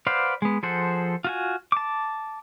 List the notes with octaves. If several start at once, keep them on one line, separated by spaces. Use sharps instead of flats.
B4 C5 D5 F5 F#5
G#3 B3
F3 G#4 A4 C5 F#5
F4 F#4 G#5
A5 D6